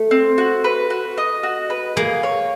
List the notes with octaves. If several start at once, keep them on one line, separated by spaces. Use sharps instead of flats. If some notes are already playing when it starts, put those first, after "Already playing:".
Already playing: A3
C4
F#4
B4
F#4
D#5
F#4
B4
A#3 G#4
C#5